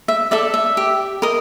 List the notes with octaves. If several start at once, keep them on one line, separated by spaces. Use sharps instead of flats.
E5
A4 D5 E5
E5
G4
A#4 D#5